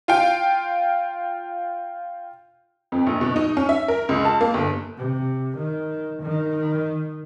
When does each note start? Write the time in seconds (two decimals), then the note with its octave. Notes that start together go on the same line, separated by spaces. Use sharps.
0.08 F4 F5 G5
2.92 F2
3.07 A#1
3.21 B2
3.36 D#4
3.57 C#4
3.69 E5
3.88 A#4
4.09 C#2
4.25 A5
4.41 A#3
4.54 G1
4.98 C3
5.58 D#3
6.23 D#3